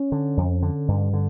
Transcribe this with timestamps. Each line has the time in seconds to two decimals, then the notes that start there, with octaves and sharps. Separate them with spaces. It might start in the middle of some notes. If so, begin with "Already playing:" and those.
Already playing: C#4
0.12 D3
0.37 F2
0.62 D3
0.88 G2
1.13 D3